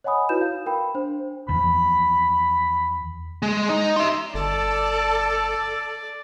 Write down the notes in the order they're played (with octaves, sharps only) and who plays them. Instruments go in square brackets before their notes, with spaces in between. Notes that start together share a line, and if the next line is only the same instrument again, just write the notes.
[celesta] C#5 D#5 F#5 G#5 B5 D#6
D#4 E4 F#4 B4 G6 E7
F5
A#4 G5 B5
D4 C5
[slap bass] E2 D#3 F3 [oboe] B5
[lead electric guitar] G#3
D#4
E5 C6
[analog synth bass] G1 [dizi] A4 [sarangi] D5 [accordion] A5